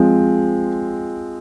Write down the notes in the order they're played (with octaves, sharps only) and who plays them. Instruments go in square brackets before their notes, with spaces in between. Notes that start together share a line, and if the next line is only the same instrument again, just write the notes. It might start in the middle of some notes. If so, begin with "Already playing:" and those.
Already playing: [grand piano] F3 G#3 C4